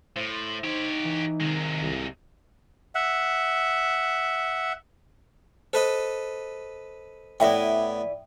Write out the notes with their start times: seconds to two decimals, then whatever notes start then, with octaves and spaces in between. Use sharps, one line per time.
0.16 A2 C5
0.64 D#4 G4 C#5
1.05 E3
1.40 C3 D#3 G#3
1.81 C2
2.95 E5 F#5
5.73 A4 B4 C5 D#5
7.40 A2 B3 E4 B4 D5 E5 G5